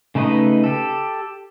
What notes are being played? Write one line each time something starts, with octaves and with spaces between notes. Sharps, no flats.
C#3 A3 D#4 B4 D#5
G4 A4